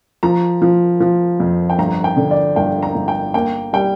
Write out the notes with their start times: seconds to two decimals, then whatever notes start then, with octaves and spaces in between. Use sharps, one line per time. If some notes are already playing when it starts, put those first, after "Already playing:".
0.23 F3 A#5
0.62 F3
1.00 F3
1.40 F2
1.70 G5
1.79 G1 A#5
2.04 G5
2.17 D3
2.31 D5
2.56 G1 G5
2.83 A#5
2.95 G1
3.08 G5
3.34 A#3 G5
3.73 G3 G5